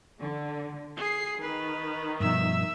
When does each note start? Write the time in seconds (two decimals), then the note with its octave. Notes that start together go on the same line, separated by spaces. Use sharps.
0.19 D3
0.97 G#4 C7
1.42 D#3 B4
2.20 G2 B2 F3 E5 E6